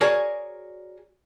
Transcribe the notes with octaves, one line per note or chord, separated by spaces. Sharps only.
F#4 G#4 A#4 C#5 D5 G#5